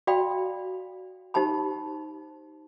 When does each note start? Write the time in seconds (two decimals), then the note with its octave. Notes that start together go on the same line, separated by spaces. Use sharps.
0.07 F#4 D5 F5 G5 B5
1.34 D#4 G4 C5 A5 B5